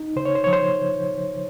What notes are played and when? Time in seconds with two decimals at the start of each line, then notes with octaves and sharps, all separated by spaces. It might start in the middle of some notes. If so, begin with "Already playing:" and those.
Already playing: D#4
0.16 C#3 C5
0.25 C#5
0.35 C5
0.44 F3 C#5
0.53 C5